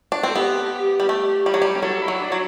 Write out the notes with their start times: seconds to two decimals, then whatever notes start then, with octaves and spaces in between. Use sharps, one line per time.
0.12 D4
0.23 C4
0.29 A4
0.35 B3 G4
1.00 G3
1.09 A3
1.46 G3
1.54 F#3
1.62 G3
1.77 G4
1.82 F#3 A4
2.01 E4
2.08 F#3
2.20 D4
2.32 F#3